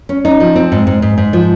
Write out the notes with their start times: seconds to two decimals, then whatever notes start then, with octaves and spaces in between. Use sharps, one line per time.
0.09 C#4
0.25 D#4
0.40 F3
0.56 C4
0.72 G#2
0.87 G#2
1.02 G#2
1.18 G#2
1.33 F3